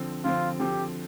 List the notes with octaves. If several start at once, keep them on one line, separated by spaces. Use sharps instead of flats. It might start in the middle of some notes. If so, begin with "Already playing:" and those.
Already playing: D3 F3 C4
D3 F3 C4 F4
D3 F3 C4 G4